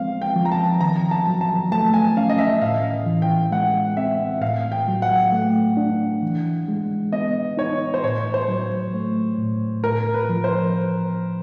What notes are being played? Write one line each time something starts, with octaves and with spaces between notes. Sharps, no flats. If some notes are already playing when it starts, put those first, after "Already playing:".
Already playing: F3 G#3 C4 F5
G5
F3
A#5
A5
D#3 A#5
A5
F#3
A5
A3 A5
G#5
C#4 F5
D#5
E5
A2 F5
E3
G5
G#3 F#5
C4 E5
A2 F5
G5
F#3
F#5
A3
D4
E3
G#3
B3 D#5
D#4 C#5
C5
A2 C#5
C5
F#3
A3
A2
A2 A#4
B4
F3
C5